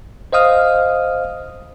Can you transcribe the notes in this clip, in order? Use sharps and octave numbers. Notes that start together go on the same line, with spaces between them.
C5 D#5 F5 D#6 F6